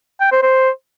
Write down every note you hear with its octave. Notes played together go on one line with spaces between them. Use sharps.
G5
C5
C5